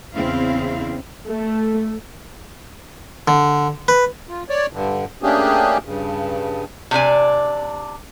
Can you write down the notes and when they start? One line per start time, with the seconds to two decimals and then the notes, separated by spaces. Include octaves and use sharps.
0.15 E2 C#3 C4 E4 F5
1.29 A3
3.28 D3
3.88 B4
4.28 F4
4.49 C#5 D5
4.73 G2 D3
5.23 A3 A#3 C#4 D4 G4 G#4
5.85 G2 C#3
6.91 C3 D4 D5 G#5